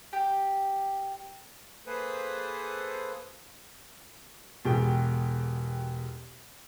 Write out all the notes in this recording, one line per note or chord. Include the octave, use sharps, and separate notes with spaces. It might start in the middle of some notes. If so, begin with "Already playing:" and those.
G4
A#3 G#4 A4 B4 C5 D#6
E1 B2 G4 G#4 G5